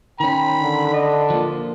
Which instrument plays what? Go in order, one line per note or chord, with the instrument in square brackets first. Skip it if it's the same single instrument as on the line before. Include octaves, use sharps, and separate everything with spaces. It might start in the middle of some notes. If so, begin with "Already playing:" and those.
[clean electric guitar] D#3 C#4 [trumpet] G5 [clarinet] B5
[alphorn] D3
[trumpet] D4 [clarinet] D#5
[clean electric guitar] F3 A#3 [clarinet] F4